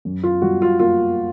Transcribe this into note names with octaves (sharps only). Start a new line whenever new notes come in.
F#2
F4
G3 F#4
F4
A#3 F4